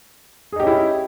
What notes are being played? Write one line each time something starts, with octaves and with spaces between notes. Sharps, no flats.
C#4 D#4 E4 G4 G#4